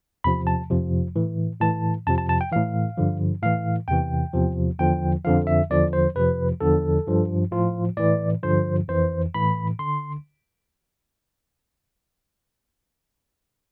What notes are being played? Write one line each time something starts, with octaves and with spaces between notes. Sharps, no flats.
E2 C3 F3 B5
A5
F2 C3 F3
A2 E3
A2 E3 A5
F2 C3 F3 A5
A5
A5
G5
A2 E3 F5
G2 D3 F3
A2 E3 F5
E2 C3 E3 G5
E2 C3 F3
E2 D3 F3 G5
F2 D3 F3 F5
E5
E2 D3 F3 D5
C5
F2 C3 F3 B4
E2 D3 F3 A4
G2 F3
A2 F3 F4
A2 E3 D5
G2 D3 F3 C5
F2 E3 C5
A2 E3 B5
D3 C6